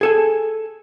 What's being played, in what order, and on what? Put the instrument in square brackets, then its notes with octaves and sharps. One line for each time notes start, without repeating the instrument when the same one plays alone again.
[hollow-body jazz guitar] G#4 A4 G#5